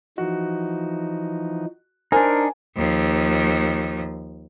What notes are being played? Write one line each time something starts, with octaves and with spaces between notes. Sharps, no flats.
E3 F3 D#4 F#4
D4 D#4 A#4 C5 G#5
D#2 F3